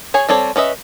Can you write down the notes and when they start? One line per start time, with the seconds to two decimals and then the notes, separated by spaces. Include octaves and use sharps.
0.14 G#4 C#5 G#5
0.29 G3 C4 A4 C#5 D5
0.56 C#4 B4 D#5 E5